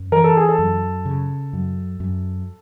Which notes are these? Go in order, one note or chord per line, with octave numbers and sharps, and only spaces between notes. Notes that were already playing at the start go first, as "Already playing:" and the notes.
Already playing: F#2
E3 A#4
A4
G#4
A4
F#2
C#3
F#2
F#2